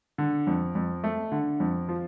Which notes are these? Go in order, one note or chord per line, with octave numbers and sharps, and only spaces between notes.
D3
F2
F2
A3
D3
F2
F3